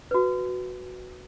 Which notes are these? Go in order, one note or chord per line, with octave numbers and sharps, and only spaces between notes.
F#4 B4